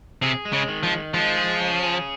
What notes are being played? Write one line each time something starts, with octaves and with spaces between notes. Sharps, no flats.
C3 G#4
G#3
C#3
D#3
F3
D#3
F3 G#3
G#4
C#4
G#4